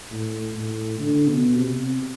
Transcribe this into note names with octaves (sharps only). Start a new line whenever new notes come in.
A2
A2
D3
B2
C3